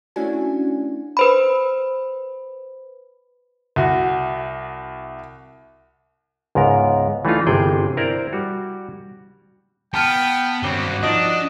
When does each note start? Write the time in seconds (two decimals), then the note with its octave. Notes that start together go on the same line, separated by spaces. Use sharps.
0.16 A3 C#4 D4 E4 F#4 G#5
1.17 B4 C5 B5
3.76 C2 F#4
6.55 C#2 G#2 B3 A#4
7.25 E3 A3 D4 D#4 F4
7.47 G1 C3 E3 G#4 G5
7.97 E4 A#4 C5 D5
8.33 G3 F#4
9.94 B3 G5 A5 F6
10.63 G#1 G2 C4 C#4 F#4 G7
11.03 F3 D4 D#4 D#5